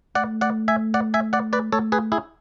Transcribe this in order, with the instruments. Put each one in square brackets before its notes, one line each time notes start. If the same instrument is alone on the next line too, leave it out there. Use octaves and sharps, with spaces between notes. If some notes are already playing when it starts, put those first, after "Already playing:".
[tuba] A3 [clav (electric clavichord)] D5 F#5
[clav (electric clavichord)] D5 F#5
E5 G#5
D5 F#5
E5 G#5
D5 F#5
B4 D5
[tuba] A3 [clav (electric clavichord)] A4 C#5
[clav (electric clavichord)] G#4 B4
E4 G#4